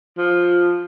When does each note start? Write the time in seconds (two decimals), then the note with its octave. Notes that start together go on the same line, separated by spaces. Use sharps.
0.18 F3